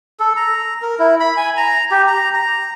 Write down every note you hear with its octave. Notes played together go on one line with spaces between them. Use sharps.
A4
A#5
A#4
E4
B5
G#5
A#5
G4
A#5
A#5